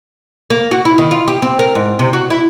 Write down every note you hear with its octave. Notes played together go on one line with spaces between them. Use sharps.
A#3
F#4
E4
D#3
F4
G4
C4
A#4
G#2
C3
F#4
E4